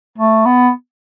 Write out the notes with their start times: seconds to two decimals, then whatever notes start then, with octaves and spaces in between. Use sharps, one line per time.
0.18 A3
0.45 B3